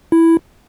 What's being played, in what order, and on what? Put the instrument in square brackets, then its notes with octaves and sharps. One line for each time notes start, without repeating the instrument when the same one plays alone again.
[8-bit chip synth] E4